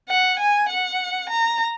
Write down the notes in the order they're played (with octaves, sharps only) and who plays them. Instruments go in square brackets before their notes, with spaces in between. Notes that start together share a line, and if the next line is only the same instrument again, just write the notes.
[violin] F#5
G#5
F#5
A#5